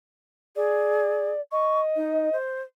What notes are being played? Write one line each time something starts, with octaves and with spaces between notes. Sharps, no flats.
G#4 D5
D#5 C#6
D#4
C5